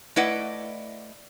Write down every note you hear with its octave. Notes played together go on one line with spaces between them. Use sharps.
A3 E4 B4 D5 D#5 F#5